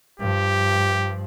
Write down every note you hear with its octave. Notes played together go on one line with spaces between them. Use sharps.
G2 F3 G4